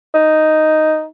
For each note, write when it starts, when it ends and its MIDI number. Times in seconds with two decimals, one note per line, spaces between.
0.14 1.04 63